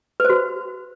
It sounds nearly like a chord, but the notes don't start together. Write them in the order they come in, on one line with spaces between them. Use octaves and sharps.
B4 C5 F#4